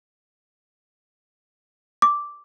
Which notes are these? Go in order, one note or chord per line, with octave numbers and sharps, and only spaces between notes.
D6